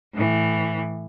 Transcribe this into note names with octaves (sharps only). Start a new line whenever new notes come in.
A2 E3